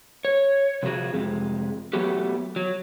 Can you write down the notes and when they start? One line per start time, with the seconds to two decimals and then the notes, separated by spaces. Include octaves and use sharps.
0.25 C#5
0.83 C3 F3 F#3 F#4 G#4
1.13 F2 C3 G#3
1.93 F#3 A3 B3 F#4 G4
2.56 F#3